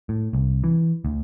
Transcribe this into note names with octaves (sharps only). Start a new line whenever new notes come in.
A2
C2
E3
D2